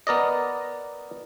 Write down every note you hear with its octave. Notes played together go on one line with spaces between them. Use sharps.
B3 A#4 D5 D#5